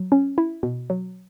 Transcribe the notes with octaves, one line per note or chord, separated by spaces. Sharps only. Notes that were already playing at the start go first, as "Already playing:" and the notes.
Already playing: F#3
C#4
E4
B2
F#3